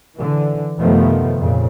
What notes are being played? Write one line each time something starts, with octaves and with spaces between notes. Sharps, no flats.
D3 E3
F#2 C3 D#3 F3 A3 B3
F2 A#2 C#3